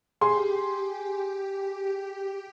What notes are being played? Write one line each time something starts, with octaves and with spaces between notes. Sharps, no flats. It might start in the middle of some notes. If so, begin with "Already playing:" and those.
G4 G#4 C6